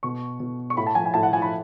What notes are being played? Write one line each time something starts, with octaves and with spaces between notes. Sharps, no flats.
B2 C#6
B2
C#6
A2 B5
A5
F3 G#5
G#5
A2 A5
F#5
F3 G#5
B5